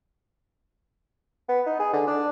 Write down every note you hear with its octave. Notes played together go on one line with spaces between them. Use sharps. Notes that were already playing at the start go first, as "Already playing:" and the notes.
B3
D#4
G#4
D3
D4